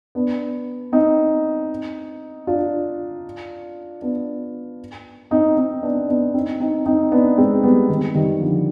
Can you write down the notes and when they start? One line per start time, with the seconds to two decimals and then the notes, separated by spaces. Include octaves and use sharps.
0.15 B3 D4
0.92 C4 D#4
2.47 D4 F4
4.02 B3 D4
5.31 C4 D#4
5.57 C4 D#4
5.83 B3 D4
6.09 B3 D4
6.34 C4 D#4
6.60 C4 D#4
6.86 C4 D#4
7.12 B3 D4
7.38 G#3 C4
7.63 G3 B3
7.89 D#3 G3
8.15 D#3 G3
8.41 D3 F3